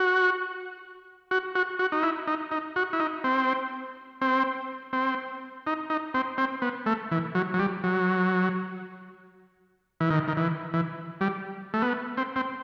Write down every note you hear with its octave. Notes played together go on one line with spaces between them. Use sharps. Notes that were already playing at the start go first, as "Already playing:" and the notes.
Already playing: F#4
F#4
F#4
F#4
D#4
E4
D#4
D#4
F#4
E4
D#4
C4
C4
C4
D#4
D#4
C4
C4
B3
A3
E3
F#3
F#3
G3
F#3
E3
D#3
D#3
E3
E3
G3
A3
B3
C4
C4